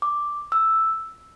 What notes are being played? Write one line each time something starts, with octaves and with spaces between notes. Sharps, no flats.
D6
E6